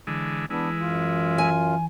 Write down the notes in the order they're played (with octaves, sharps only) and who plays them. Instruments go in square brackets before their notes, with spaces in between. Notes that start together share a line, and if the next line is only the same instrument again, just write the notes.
[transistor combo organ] D3 E3 G#3
[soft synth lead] E3 [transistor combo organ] G#3 E4 [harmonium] B3 D4
[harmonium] F#2 F4
[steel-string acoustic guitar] G#5